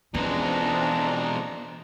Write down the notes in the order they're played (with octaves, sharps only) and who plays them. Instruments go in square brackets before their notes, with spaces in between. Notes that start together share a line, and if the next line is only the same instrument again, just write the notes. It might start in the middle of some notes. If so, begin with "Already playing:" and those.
[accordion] F2 G#3 A#5 [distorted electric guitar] B2 E3 [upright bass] C#4 [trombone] D4